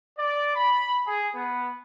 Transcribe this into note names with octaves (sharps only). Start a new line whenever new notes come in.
D5
B5
G#4
B3